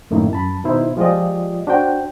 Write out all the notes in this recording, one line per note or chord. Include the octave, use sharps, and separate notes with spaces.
F#2 A2 D#3 A3 A#3 E4
F#2 A5 B5
B2 D#3 D#4 E4 C5
F3 G#3 F4 G4 D5 D#5
D4 F#4 C5 G5